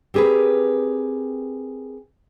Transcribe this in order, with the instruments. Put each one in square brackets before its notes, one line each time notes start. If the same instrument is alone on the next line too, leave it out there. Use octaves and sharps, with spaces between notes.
[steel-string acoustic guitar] C4 G4 G#4 A#4 B4